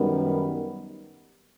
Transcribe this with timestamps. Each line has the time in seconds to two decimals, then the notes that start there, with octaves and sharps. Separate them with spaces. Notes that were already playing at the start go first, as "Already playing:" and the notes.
Already playing: F#2 D#3 G3 B3